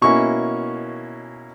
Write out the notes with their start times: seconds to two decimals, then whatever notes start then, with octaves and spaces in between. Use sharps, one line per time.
0.01 B2 A#3 C#4 E4 C#6